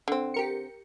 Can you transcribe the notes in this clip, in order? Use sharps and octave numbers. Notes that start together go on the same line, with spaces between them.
D3 C4
G4 A#4 C#7